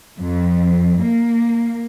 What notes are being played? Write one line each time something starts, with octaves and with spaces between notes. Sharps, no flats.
F2
A#3